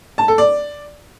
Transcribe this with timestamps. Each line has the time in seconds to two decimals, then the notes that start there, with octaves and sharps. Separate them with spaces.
0.18 A5
0.28 A4
0.38 D5